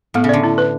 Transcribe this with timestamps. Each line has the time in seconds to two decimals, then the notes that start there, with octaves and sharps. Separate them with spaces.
0.14 A2 B3
0.24 C#3
0.29 D3 D5
0.44 E4
0.58 B4